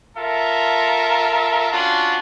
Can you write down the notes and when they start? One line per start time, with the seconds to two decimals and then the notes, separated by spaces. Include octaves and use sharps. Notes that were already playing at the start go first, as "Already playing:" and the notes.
0.17 F4 A4 A#4 E5
1.72 C#4 D4 F4 F#4